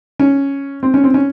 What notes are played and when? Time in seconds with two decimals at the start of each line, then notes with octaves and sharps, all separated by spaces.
0.19 C#4
0.83 C4
0.94 C#4
1.04 C4
1.14 C#4